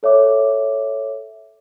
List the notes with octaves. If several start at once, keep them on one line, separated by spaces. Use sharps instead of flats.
A4 C#5 E5 D6